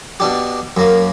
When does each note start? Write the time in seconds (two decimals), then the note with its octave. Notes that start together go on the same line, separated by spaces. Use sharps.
0.20 B2 D4 G4
0.77 F#2 A#3